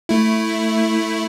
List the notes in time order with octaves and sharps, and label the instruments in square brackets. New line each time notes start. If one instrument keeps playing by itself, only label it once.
[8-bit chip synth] A3 E4